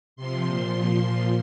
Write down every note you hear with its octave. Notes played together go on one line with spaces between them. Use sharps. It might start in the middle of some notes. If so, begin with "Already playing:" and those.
C3 F3 C6
A#2 F3
A#2 F3
A#2 F3